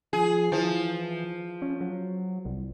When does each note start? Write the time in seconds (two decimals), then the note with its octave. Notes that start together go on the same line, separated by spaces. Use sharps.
0.13 F3 G#4
0.52 E3 F3
1.62 C#4
1.81 F#3
2.45 C2